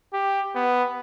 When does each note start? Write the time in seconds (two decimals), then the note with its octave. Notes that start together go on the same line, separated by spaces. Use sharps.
0.13 G4
0.55 B3